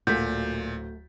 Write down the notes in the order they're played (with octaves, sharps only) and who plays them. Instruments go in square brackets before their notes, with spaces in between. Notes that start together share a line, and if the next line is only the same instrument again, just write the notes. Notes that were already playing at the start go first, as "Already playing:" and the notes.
[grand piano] D1 B6 [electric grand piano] A#2 [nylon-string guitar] A3 F#4 [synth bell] G6